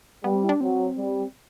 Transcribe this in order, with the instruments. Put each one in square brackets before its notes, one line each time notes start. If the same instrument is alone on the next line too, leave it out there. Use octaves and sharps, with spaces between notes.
[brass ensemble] G3 [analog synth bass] B3
[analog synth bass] C4
E4
D4
[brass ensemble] F#3 [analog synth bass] C4
[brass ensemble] G3